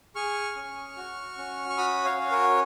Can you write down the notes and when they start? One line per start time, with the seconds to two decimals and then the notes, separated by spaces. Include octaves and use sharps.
0.15 G#4 C#6 F6
0.56 C#4
0.97 F#4
1.38 C#4
1.70 C#6
1.77 F#4 B5 D#6
2.04 C#5 F5
2.18 C#4
2.31 A#4 C#5